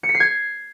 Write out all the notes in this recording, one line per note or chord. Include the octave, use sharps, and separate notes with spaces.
C#7
B6
C7
G#6